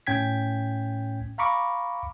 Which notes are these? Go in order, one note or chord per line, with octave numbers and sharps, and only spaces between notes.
A2 C#4 G5 G#6 B6
F5 A#5 B5 C#6 D6